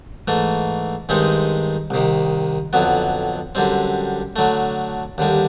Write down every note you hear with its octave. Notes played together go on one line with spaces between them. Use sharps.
G#2 E3 A3
G2 D#3 G#3 C4 D#4
C2 C3 D#3
F2 D3 F#3 B3
F#2 D3 G3 C4
D3 F#3 A3
D#2 D3 G3